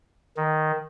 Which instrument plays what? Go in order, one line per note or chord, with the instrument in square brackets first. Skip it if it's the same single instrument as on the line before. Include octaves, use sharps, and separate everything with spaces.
[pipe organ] D#3